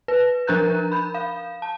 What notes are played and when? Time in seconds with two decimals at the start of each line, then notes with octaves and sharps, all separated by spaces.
0.08 B4
0.47 F3 D4 A#4 A#5 F#6 G6
0.92 B5 G6
1.14 F5
1.62 A5